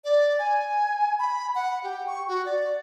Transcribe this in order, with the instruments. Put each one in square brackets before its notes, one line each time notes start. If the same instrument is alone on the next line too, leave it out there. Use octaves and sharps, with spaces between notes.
[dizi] D5
G#5
B5
F#5
G4
C#6
F#4
D5